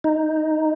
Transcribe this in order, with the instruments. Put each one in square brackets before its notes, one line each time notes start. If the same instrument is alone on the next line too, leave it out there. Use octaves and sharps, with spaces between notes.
[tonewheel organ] D#4